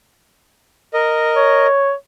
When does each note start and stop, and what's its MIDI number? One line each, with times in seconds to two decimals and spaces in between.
0.94 1.67 70
0.94 1.67 75
1.36 1.92 73